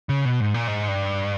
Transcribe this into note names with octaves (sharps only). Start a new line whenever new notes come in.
C#3
B2
G#2
A#2
G#2
G2